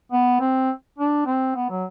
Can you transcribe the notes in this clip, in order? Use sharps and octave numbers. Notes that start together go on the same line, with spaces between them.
B3
C4
D4
C4
B3
F#3